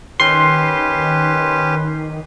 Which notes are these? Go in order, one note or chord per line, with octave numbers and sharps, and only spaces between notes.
D#3 C#4 G4 B4 C6